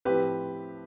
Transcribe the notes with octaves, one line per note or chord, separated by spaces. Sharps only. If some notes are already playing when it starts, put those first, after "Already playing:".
A2 F3 C4 G4 B4